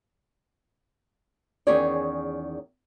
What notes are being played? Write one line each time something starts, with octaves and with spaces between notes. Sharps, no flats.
E2 D#3 C#4 G#4 C#5 D5